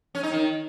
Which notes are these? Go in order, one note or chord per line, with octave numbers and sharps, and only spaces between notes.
C#4
D#4
D#3